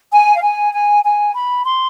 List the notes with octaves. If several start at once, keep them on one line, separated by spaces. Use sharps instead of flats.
G#5
F5
G#5
G#5
G#5
B5
C6